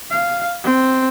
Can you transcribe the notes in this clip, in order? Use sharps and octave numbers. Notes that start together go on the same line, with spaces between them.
F5
C4